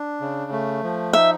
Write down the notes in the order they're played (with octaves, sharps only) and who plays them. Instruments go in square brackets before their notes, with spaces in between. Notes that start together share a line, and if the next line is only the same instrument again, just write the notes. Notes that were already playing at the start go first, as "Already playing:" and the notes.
Already playing: [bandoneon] D4
C#3
A3
F3
[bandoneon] D#4 [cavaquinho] E5